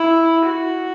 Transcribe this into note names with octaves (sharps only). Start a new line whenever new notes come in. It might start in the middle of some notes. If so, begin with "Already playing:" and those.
Already playing: E4
F#4